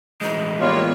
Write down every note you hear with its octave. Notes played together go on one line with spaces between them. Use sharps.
A2 E3 G#3 D#5
G3 A#3 B3 F4 C#5